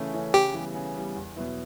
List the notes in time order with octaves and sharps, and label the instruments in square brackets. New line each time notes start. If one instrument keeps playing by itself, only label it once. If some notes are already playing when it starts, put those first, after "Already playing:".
Already playing: [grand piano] C#3 E3 A3 C#4
E3 A3 C#4
[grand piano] C#3 [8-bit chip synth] G4
[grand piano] E3 G3 B3
C#3
E3 G3 B3
E2
B2 F#3 B3 E4